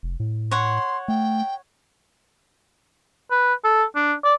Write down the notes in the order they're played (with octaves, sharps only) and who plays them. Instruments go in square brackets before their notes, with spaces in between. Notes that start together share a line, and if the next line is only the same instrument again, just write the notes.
[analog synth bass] F1
A2
[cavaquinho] C#5 F#5 [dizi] C6
[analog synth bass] A3 [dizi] G5
[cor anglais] B4
A4
D4
D5